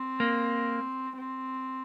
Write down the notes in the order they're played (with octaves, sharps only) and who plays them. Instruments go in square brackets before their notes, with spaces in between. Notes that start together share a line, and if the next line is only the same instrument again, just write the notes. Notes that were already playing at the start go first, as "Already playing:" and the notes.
Already playing: [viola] C4
[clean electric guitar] A#3
[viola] C4